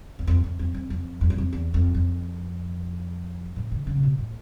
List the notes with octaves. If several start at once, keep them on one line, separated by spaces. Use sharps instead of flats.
E2
F2
F2
F2
F2
F2
F2
F#2
F2
E2
F2
F2
A2
D3
C#3
A#2
B2
A2